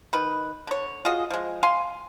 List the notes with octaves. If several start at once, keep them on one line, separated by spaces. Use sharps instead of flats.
D#3 B4
D3 C#5
F4 F#4 G#4 D#5
F3 G#3
F5 G#5 C6